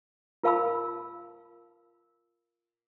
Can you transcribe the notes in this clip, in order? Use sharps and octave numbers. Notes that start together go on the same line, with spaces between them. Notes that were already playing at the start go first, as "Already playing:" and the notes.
F4 A#4 F5 A5 B5 E6